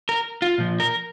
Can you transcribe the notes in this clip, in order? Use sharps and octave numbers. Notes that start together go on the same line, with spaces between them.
A#4
F4
A#2 F3
A#4